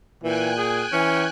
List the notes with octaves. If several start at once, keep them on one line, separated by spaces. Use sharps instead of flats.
A#2 E3 G5 G#5 F#6
G#4
E3 C#4